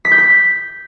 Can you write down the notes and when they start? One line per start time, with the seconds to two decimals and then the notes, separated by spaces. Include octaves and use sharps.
0.05 B6
0.12 G6
0.18 B6